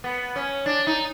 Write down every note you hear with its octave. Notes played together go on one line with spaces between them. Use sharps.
B3
C#4
D4
D#4